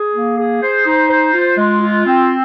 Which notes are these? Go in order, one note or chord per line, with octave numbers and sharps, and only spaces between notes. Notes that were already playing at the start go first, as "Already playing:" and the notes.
Already playing: G#4
A#3
G#4
C5
D#4
C5
F4
G#3
F4
C4